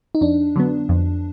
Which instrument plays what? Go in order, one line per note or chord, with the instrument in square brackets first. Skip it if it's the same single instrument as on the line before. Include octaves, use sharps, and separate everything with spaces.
[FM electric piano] D#4
[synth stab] F2 [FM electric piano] D4
[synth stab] D3 F#3 B3
F2